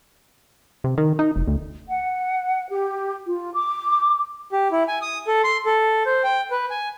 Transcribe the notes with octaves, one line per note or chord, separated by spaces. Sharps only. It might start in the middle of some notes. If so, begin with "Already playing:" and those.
C3
D#3
D#4
F1
D2
F#5
G4
F4
D6
G4
E4
G#5
D#6
A4
C6
A4
C5
G5
B4
G#5